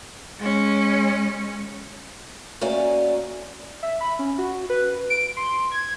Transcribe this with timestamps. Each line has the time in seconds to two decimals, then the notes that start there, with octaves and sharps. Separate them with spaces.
0.40 G#3 C#4
2.61 A3 A#3 C#4 F#4 D5 G#5
3.83 E5
4.01 B5
4.19 C#4
4.38 F#4
4.70 B4
5.10 D7
5.37 C6
5.72 G#6